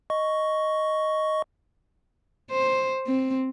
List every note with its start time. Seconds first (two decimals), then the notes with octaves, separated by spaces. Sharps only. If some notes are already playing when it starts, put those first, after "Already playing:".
0.10 D#5 C#6
2.51 C5
3.07 C4